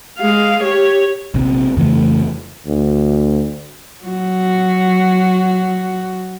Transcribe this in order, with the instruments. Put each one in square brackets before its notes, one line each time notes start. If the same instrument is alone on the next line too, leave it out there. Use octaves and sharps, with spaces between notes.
[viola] G#3 F5
G4 C#5
[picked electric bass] A#1 C3
F2 C#3 E3 A3
[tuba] D2
[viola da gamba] F#3 F#4